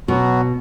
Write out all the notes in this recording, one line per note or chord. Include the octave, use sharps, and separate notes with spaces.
B2 F#3 B3 F#4